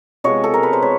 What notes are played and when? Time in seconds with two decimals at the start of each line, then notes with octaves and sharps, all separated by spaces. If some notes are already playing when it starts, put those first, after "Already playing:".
0.24 C3 F3 G#3 B3 C#5 D#5
0.44 A4
0.54 A#4
0.63 B4
0.73 C5
0.82 B4 C#5